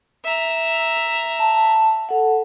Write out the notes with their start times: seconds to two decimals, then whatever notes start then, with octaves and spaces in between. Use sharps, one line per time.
0.24 E5 A#5
1.39 A5
2.09 A4 F#5